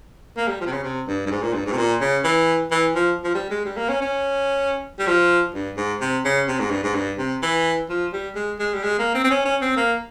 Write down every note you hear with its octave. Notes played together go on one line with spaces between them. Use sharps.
A#3
G3
F3
C3
C#3
C3
G2
G2
G#2
A#2
G2
G#2
C3
A#2
C#3
E3
E3
F3
F3
G3
G#3
G3
A#3
C#4
C#4
G3
F3
G2
G#2
C3
C#3
C3
G#2
G2
G#2
G2
C3
E3
F3
G3
G#3
G#3
G3
G#3
A#3
C4
C4
C#4
C#4
C4
A#3